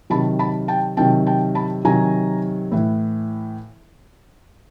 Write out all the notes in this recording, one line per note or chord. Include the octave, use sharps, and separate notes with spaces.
C3 D#3 F#3 A5 B5
A5 B5
G5 A5
C3 D#3 F#3 G5 A5
G5 A5
A5 B5
C3 D#3 F#3 G#5 A#5
A2 E3